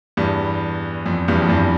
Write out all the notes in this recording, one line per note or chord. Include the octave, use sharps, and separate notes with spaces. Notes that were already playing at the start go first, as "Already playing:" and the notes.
E2 G2
F2
E2 G2
F2
E2 G2